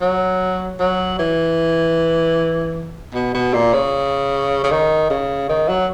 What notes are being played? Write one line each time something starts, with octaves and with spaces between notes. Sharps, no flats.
F#3
F#3
E3
B2
B2
A#2
C#3
C#3
D#3
C#3
D#3
F#3